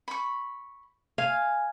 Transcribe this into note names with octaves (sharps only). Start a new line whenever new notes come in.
B5 C#6
F5 G#5